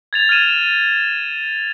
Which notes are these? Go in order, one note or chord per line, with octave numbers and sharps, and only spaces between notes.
G#6 A6 F7
F6 G#6 D#7 E7